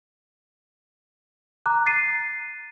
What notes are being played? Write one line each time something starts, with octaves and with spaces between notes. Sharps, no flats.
A#5 D6 F#6
A6 C7 D#7